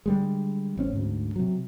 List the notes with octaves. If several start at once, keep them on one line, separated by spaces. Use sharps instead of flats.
D3 G3 G#3
A1 C4 C#4
D2 G#2
C3 F#3